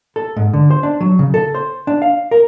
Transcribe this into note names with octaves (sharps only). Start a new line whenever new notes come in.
A4
G#2
D3
C5
D4
F#3
C#3
A4
C5
D4
F5
A#4